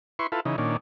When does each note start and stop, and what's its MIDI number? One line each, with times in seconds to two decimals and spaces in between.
0.19 0.27 64
0.19 0.27 71
0.19 0.27 84
0.19 0.27 85
0.32 0.40 64
0.32 0.40 65
0.32 0.40 69
0.32 0.40 71
0.45 0.56 49
0.45 0.56 52
0.45 0.56 63
0.58 0.77 46
0.58 0.77 51
0.58 0.77 61
0.58 0.77 62